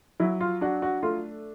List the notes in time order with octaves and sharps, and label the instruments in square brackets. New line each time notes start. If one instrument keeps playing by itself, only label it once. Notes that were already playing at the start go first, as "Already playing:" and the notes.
[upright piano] F#3 E4
F4
D4 F#4
F#4
A3 F4